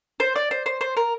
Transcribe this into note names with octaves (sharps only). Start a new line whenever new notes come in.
C5
D5
C5
C5
C5
A#4